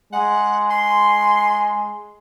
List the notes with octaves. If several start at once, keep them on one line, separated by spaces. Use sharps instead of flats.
G#3 F#5
C6